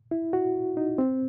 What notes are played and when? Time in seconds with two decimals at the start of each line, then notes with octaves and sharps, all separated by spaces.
0.11 E4
0.33 F#4
0.77 D#4
0.98 C4